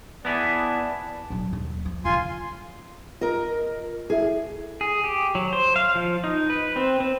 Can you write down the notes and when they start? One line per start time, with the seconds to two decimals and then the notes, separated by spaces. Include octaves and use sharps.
0.25 B3 E4 G#4 B4 D5 A5
1.30 D1 F#3
1.53 D#2
1.86 F3
2.05 C#3 F3 F4 G#5 C6
3.21 F4 A#4 D#5
4.10 E4 G#4 A4 E5
4.81 G#4
5.04 G4
5.35 F#3
5.53 C5
5.76 F5
5.95 F3
6.24 D#4
6.50 B4
6.76 C4
7.00 C4